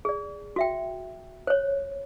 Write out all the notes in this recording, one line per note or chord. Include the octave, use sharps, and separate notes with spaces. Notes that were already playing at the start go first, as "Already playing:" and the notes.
G#4 D5
F#4 E5 G5
C5 C#5